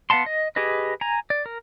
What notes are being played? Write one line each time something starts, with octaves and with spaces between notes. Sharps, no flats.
B3 F5 F#5 A5 C6
D#5
G4 G#4 B4 D#5
G#5 A#5
D5
A#4